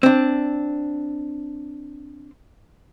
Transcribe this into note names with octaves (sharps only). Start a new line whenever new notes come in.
C4 D4